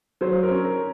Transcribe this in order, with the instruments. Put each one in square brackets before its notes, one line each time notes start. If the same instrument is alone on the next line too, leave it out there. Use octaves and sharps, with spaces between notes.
[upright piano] F#3 C5
A#4
C#4
A#4